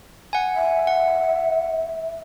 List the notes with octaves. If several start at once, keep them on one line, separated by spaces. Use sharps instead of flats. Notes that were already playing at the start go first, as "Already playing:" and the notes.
F#5 G#5
E5
F#5